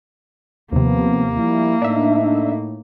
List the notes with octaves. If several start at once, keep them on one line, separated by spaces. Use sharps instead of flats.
D#2 C3 F3 A#3 B3
F3 G3 E4
A2 D4 D#4 E5